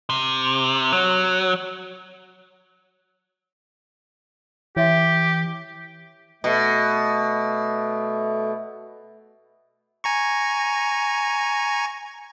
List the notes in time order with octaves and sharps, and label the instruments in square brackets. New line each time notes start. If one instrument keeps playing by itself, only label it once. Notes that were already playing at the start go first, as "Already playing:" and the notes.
[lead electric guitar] C3
F#3
[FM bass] E3 [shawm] G4 [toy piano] C#5 E5 C6
[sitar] B2 [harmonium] A3
[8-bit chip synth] G#5 A#5 C#6